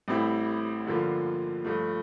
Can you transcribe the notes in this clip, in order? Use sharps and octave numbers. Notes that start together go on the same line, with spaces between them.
A1 A2 G3 C4 E4
G2 D3 F3 A#3 F4
G2 F3 A3